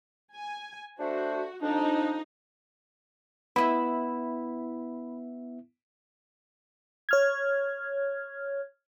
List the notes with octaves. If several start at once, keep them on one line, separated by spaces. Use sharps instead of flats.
G#5
A3 D4 F#4 C5
F2 D4 D#4
B3 E4 D#5 E5 B5
C#5 F6 G#6